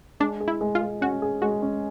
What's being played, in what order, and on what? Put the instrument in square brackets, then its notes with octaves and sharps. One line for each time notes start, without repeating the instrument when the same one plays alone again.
[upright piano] G#3 [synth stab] D4
[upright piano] G#4
[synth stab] E4
[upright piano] G#3
[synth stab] F4
[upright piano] G#3
[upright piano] C#4 [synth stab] F#4
[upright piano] G#4
[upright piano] G#3 [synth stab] F#4
[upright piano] C#4